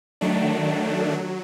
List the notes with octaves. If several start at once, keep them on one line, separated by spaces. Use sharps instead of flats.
D#3 F#3 A3 D4
F#3